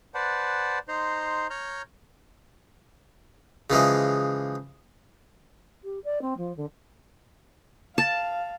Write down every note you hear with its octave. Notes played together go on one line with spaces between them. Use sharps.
B4 C5 D5 F#5 A5
D#4 C5 A#5 C6
C#5 A#5 F6 G6
C#3 E3 F3 G#3
G4
D5
C4
F3
D3
F5 A5